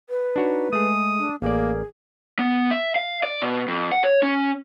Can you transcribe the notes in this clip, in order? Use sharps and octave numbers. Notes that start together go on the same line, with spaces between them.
B4
D4 D#4 F#4 C#5
G#3 A3 G#4 D#6
D4
A1 A#3 G#4 A#4 D5
B3
E5
F5
D5
B2
F2
F#5
C#5
C#4